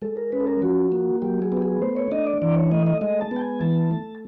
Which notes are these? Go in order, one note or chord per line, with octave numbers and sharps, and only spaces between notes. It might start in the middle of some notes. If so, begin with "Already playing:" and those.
G#3 A4
A#4
C#4 B4
A4
A#4
F3 F#4
A#3
F#3 G4
G#4
B3 G4
G#4
A3 C5
C#5
D4 D#5
D5
E3 D5
C#5
A3 D#5
D#5
G#3 D#5
A5
B3
G5
G#5
E3 A5
A3